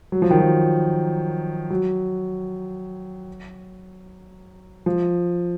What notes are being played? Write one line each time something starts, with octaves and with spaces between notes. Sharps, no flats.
F#3
F3
D#3
F3
F#3
F3